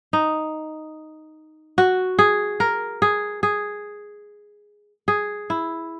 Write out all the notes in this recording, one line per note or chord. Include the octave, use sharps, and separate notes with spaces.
D#4
F#4
G#4
A#4
G#4
G#4
G#4
E4